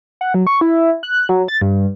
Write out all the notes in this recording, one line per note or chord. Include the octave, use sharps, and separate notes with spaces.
F#5
F#3
C#6
E4
F#6
F#3
A6
G2